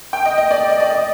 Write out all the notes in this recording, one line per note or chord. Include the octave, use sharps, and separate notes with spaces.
G5
D#5
D#5
D5
D#5
D5
D#5